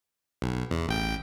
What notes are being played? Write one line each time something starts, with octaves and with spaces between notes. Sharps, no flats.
B1
E2
A1 G5